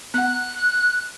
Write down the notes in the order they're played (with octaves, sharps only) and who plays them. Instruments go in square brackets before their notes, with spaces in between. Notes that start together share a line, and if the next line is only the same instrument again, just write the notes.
[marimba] B3 F#5 [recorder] F#6